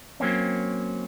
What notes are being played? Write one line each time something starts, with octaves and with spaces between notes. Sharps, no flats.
F#3 A#3 C4 C#4